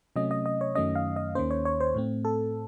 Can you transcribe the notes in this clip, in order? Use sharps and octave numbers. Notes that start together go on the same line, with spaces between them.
C3 F#3 A3 C#4 D#5
D#5
D#5
C#5
F#2 D#3 F#3 A3 C#4 D#5
F5
D#5
D#2 D#3 A#3 C#4 C5
C#5
C#5
C5
A2 A3 C4
A4